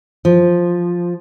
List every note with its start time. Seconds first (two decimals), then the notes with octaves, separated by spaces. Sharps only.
0.25 F3